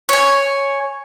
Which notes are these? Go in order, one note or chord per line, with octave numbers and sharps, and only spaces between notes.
C#5 G#5